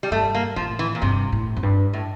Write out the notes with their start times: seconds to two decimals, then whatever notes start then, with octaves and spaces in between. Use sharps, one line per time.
0.03 G3
0.11 G2 A3
0.35 A#3
0.56 A2 F3
0.79 E3
0.95 A#2
1.02 G2 C3
1.32 A2
1.57 F2
1.63 G2
1.93 A2